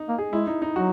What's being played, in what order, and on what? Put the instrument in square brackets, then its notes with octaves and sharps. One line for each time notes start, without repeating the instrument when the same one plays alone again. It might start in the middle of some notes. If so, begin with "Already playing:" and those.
Already playing: [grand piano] D#4
[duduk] A#3
[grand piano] G#4
[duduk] G#3 [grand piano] E4
[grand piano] D#4
D#4
[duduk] F#3 [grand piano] F#4